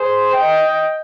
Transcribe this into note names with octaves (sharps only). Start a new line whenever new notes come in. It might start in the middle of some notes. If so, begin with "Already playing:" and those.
Already playing: G#4 C5
D#5 G5